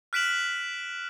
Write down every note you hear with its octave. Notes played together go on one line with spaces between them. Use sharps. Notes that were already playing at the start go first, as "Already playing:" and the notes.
F6 F#6 B6 D7 E7 F#7